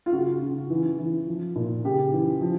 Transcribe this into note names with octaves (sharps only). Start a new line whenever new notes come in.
F4
C#3 F#4
C#3
E3
E3
F3
A#2
C#3 G4
E3
F3